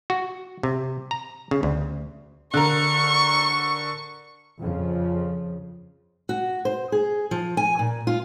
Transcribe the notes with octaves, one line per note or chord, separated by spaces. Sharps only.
F#4
C3
A#5
C#3
D2
D3 A#4 C#6
F2 C#3 F3
F#4
C5
G#4
F3
G#5
A#2
F4